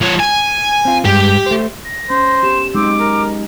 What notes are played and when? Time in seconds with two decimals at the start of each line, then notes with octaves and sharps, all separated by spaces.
0.01 F3 C#5
0.20 G#5
0.85 C4 F4
1.05 G2 G#3 G4
1.46 A3 C5
1.85 A#6
2.10 C#4 C5
2.43 B3 G4 E7
2.75 F#3 G#3 C4 D#4 D6
3.00 A#4